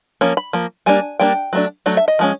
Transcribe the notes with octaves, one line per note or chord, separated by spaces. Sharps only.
F3 A#3 C#4
B5
F3 A#3
G3 A#3 D4 G#5
G3 A#3 D4 G5
F#3 A3 D4
F#3 A3 D4
E5
D#5
F3 G#3 C#4